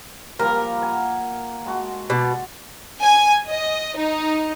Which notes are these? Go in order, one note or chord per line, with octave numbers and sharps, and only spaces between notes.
F3 G3 A#3 A#4
F#5 G#5
G#3 F#4 A5
B2 D5 F#5
G#5
D#5
D#4